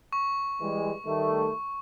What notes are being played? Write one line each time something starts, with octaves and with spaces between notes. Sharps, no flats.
C#6
E3 G3 G#3
D#3 G3 A3